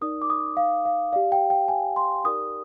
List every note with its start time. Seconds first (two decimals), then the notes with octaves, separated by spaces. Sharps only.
0.01 D#4 A#4 D5 D#6
0.22 D6
0.30 D#6
0.57 F5
0.85 F5
1.13 G4 D5 F5
1.32 G5
1.50 G5
1.68 G#5
1.96 C6
2.24 D#4 G4 A#4 D5 D#6